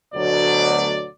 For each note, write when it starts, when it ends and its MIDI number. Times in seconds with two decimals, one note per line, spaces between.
0.14 1.06 38
0.14 1.06 47
0.14 1.06 54
0.14 1.06 74